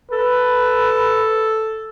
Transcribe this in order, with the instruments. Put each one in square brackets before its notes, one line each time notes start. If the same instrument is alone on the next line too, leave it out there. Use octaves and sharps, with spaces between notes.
[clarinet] A4 [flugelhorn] B4